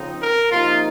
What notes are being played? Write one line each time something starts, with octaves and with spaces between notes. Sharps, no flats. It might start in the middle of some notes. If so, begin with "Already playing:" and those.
Already playing: C#3 F3 C4 D#4
A#4
C3 F3 A#3 D#4 F4